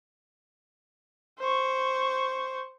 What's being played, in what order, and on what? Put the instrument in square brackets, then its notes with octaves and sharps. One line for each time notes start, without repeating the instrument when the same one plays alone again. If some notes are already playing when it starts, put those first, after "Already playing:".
[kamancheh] C5 C#6